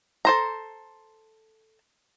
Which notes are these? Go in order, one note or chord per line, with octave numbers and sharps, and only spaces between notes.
A4 C5 A#5